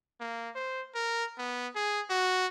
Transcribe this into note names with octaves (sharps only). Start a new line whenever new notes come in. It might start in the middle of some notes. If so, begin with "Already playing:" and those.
A#3
C5
A#4
B3
G#4
F#4